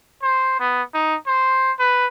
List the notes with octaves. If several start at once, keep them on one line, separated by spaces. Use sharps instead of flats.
C5
B3
D#4
C5
B4